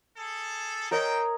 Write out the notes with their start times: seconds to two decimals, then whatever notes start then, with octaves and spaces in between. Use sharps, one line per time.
0.17 G#4 A4
0.91 C4 C#4 A#4 C#5 D#5 G5